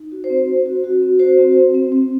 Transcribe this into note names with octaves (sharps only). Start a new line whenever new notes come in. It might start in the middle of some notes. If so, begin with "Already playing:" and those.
Already playing: D#4
F#4
C5
C4
C4
F#4
F#4
C4
F#4 C5
C4
C4
C4
C4